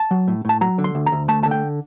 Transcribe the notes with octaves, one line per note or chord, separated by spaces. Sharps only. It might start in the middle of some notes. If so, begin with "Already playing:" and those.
Already playing: A5
F#3
A2
A2 A5
F#3 A#5
D3
C6
D2
A#5
D2
A3 A5
D3 A5
G5